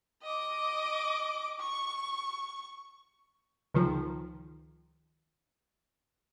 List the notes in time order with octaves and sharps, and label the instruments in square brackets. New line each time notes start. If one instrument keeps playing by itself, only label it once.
[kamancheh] D#5 D6
C#6
[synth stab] C#2 D#3 F3